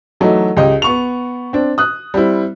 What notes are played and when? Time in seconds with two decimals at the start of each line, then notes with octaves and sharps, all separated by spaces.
0.20 E3 F#3 A3 D#4
0.57 C#2 G4 D#5
0.82 B3 C#6 F7
1.53 C4 D4
1.78 D#6 F#6
2.14 G3 C4 E4